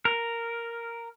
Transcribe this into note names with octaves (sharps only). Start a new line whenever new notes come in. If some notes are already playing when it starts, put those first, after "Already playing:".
A#4